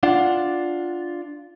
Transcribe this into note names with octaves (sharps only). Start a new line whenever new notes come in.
D4 F4 F#5